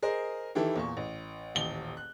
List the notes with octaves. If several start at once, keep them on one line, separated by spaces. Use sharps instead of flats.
G#4 A#4 C5 D#5
D#3 E3 E4 G4 A4
E2 A#2 C#6
A1
D#1 A1 G7
F#6